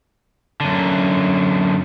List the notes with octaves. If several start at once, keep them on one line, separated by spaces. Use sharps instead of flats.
F#2 D3